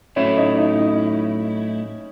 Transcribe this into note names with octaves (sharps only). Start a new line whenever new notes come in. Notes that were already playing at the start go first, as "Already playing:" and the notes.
A2 F#3 A3 C#4 E4 C#5
D#4 D#5
D#4 D#5
D#4 D#5